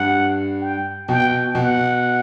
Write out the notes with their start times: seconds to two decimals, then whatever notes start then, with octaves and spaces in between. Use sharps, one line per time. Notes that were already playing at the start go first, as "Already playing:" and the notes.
Already playing: G2 F#5
0.61 G5
1.09 B2 G5
1.55 B2 F#5